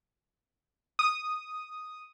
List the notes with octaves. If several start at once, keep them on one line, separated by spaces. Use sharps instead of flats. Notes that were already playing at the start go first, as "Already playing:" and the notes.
D#6